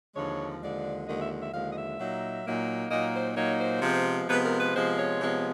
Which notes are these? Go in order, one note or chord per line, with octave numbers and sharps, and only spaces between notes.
D#2 D3 F3 G#3 C#5
D#2 D3 F3 G#3 D5
D#2 D3 F3 G#3 D#5
E5
E5
D#2 D3 F3 G#3 F5
D#5
E5
A#2 F#3 A#3 D#4
A#2 F#3 A#3 D#4
A#2 F#3 A#3 D#4 D#5
C5
A#2 F#3 A#3 D#4 C#5
C5
C3 F3 G#3 B3
C3 F3 G#3 B3 B4
A#4
B4
C3 F3 G#3 B3 C5
C#5
C3 F3 G#3 B3